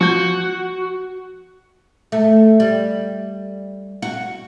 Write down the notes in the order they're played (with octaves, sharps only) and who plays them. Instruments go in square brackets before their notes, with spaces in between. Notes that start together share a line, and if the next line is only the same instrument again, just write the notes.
[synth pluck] F3 G6 [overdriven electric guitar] F#4
[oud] A3
G3
F#4